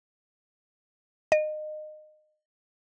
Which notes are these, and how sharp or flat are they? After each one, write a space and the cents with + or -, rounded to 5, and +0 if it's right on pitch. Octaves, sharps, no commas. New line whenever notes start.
D#5 -25